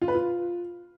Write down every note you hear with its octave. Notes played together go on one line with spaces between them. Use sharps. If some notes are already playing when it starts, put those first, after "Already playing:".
F4
B4
F4